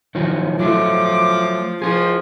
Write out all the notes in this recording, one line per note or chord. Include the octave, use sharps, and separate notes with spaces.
D#3 F3 F#3
F3 F#3 A3 D6
F3 F4 G#4